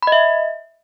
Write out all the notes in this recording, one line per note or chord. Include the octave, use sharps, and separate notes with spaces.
D#5 E5 B5